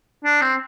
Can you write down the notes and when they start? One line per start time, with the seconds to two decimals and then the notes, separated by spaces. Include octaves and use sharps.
0.24 D4
0.42 C4